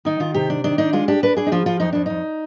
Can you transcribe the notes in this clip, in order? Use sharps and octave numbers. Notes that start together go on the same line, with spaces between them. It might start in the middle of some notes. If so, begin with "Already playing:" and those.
D#3 D#4
D#3 F4
C3 G4
D4
D#3 D4
D4 D#4
G#3 F4
D4 G4
D4 B4
D4 G#4
D#4
F3 F4
F3 F4
F2 D#4
F2 D4
F2 D#4